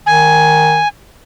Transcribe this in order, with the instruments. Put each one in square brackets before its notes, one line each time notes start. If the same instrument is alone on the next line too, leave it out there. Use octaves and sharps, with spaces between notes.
[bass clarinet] D#3 [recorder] G#5